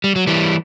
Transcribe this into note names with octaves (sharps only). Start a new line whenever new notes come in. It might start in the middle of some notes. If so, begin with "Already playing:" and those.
G3
F#3
E3 G3